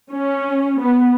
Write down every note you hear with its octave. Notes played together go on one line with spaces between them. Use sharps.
C#4
B3